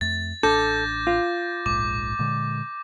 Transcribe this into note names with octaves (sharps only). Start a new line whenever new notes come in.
F2 A3 A6
A1 D4 A4 D6 G6 A#6
F4 A#6
D1 A#1 G#2 D6
A#2 D3 G#3